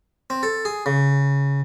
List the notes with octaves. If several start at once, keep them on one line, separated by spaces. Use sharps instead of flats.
C4
A4
G#4
C#3